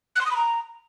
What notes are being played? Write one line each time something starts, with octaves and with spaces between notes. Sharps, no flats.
F#6
C6
D#6
B5
A#5